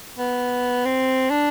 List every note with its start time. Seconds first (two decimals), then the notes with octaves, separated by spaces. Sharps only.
0.19 B3
0.85 C4
1.30 D4